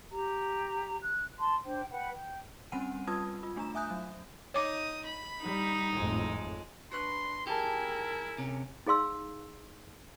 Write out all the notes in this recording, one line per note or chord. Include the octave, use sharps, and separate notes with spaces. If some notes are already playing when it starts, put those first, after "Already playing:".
G4 A#5
F#6
A5 C6
D4 C5 G5
B4 F#5 G5 B5
G5
G3 C4 C#4 F#5 G#5 D#7
G3 F4 B4 A5 D#6 G#6
F4
A3 D4 F4 A#5 E7
E5 G#5 D#6 F#6 G6
F#3
D#4 C#5 D6 D#6
B5
G3 D#4
G#1 F2 A2 G#3
D4 F#4 B4 C6 F#6
E4 G4 G#4 A#4 G#5 A5
C3 C#4
D#4 G#4 F5 C6 E6